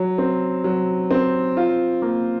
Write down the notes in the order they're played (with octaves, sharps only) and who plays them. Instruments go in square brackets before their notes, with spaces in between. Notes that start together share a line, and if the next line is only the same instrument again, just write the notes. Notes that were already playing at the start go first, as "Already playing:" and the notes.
Already playing: [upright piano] F#3
C4
F#3
C4
F4
A#3